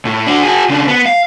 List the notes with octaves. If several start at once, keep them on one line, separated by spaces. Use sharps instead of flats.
A2
D4 F#4
F#4 G#4
C#3 D4
B3
F5